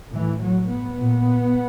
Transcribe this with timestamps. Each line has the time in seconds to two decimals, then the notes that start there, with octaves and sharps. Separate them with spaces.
0.13 A2 E3
0.41 F#3
0.69 B3
0.98 A#2